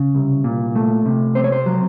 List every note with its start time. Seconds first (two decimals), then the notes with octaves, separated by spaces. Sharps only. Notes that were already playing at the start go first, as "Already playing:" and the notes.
Already playing: C#3
0.15 C2
0.44 A#2
0.75 A3
1.06 C3
1.35 C4 C5
1.44 C#5
1.52 C5
1.66 F#3